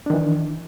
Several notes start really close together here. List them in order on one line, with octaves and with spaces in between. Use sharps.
D4 D#3 E3